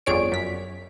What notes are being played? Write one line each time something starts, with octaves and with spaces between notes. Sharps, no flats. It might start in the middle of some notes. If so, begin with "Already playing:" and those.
G1 F2 G#4 C#5 D5 D7
F#2 B6